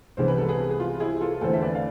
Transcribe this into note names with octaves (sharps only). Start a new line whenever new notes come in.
C2 C3 E3 G#3 B3 C5
B4
A4
G#4 B4
G#4
F4
E4 G#4
F4 A4
E2 D3 A3 C4 A4 C5
E5
B4 D5
F5